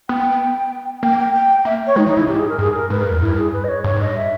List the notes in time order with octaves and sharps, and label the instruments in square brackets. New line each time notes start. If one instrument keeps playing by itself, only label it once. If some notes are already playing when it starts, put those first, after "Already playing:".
[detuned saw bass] B3 [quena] G5
[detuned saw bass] A#3 [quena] G5
[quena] G5
G5
[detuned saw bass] A#3 [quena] E5
[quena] C#5
[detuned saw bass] G#3 [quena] D#4
[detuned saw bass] E3 [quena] D#4
[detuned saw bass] C#3 [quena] E4
[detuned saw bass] G#2 [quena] G4
[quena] G#4
A#4
[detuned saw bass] G2 [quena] G#4
[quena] A#4
[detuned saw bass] G#2 [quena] B4
[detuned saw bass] G2 [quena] A#4
[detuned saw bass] E2
[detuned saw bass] G2 [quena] E4
[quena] G#4
B4
D#5
C#5
[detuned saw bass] G2 [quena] C#5
[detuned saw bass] G#2
[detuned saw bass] G2 [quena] D#5
[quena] E5